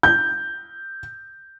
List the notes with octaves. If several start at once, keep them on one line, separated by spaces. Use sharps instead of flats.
G6